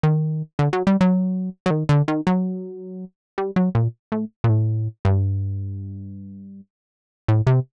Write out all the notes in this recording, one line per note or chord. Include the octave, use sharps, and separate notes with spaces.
D#3
D3
F#3
G3
F#3
F#3
D#3
D3
D#3
F#3
G3
F#3
A#2
A2
A#2
A2
G2
A2
C3